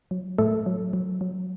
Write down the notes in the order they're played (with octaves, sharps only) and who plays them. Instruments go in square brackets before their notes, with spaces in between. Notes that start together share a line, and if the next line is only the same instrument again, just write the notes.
[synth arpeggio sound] F#3
A2 A3 A4
F#3
F#3
F#3